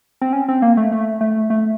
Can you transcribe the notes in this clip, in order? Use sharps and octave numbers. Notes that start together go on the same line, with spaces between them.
C4
C#4
C4
A#3
A3
A3
A3
A3